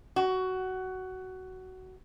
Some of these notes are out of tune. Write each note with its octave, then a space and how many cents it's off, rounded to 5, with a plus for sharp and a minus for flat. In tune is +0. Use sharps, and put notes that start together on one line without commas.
F#4 +15